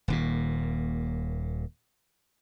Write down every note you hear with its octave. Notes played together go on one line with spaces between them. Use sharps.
D#1 D#2 A#2